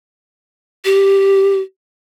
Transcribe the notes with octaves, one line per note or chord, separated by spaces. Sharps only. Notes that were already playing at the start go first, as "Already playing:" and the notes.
G4